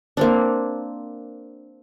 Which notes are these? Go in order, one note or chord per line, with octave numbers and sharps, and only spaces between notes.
A#3 C4 D4